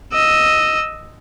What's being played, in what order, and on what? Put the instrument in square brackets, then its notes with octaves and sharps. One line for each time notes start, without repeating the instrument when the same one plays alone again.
[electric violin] D#5 E6